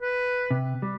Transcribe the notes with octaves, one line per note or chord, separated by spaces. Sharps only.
B4
C3
G3